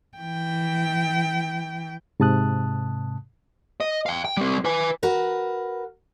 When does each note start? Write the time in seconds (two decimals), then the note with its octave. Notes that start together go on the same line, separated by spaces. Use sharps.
0.17 E3 G5
2.20 G#2 C3 A5 D#6 F#6
3.80 D#5
4.06 F5 G5
4.25 G5
4.37 G3 C4
4.65 B4 G#5
5.03 F#4 A#4 B4